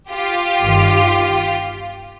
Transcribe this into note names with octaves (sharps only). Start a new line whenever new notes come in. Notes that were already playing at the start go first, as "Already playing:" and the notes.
F4 G4
G1 G2 D#3